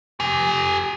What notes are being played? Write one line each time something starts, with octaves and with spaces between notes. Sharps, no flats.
G4 G#5